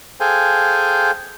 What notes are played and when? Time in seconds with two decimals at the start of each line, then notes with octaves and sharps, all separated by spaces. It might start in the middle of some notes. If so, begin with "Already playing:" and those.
0.20 G#4 A4 C5 F5 G5 G#5